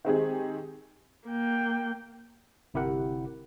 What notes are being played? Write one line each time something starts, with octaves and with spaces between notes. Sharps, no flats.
D#3 G#3 C4 D#4 G4 G#4
A#3 G5
G1 C3 E4 G4 A#4 F#5